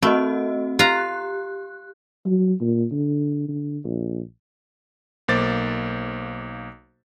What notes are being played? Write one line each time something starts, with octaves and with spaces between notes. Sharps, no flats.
A3 C4 F#4 D#5
F4 G4 A#5 F#6
F#3
A#2
D3
D3
A#1
B1 A#3 C5 D6 A6